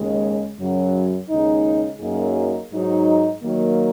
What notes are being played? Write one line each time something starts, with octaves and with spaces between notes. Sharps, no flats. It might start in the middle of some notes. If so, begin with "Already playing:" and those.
Already playing: D#2 C#3 G#3
F#2 C#3 F#3
D#2 C#3 G#3 D#4
F#2 F#3 A#3 D#4 G#4
G#2 F#3 D#4 G#4
D#3 F#3 A#3